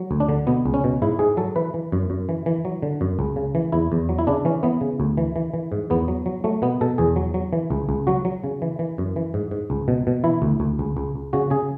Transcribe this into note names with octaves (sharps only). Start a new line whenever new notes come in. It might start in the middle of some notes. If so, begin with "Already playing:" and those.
Already playing: F#3
D2
D4
D3
B2 B3
C#2
C#4
B2
G#2 E4
G#2 G#4
F#3 A4
E3 B4
E3
F#2
F#2
E3
E3
F#3
D3
F#2
C#2
C#3
E3
E2 E4
E2
F#3
E4
C#3 D4
E3 C#4
E3 B3
C#3
D2
E3
E3
E3
G#2
E2 B3
F#3
F#3
F#3 A3
B2 B3
B2 A4
E2 G#4
F#3
F#3
E3
C#2
C#2
F#3 F#4
F#3
C#3
E3
E3
F#2
E3
G#2
G#2
C#2
B2
B2
E3 E4
D2
D2
C#2
C#2
C#2
C#3 F#4
C#3 G#4